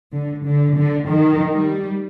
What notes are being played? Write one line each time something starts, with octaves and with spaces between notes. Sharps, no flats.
D3
D3
D3
D#3
G3